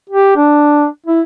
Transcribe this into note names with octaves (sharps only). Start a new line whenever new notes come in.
G4
D4
E4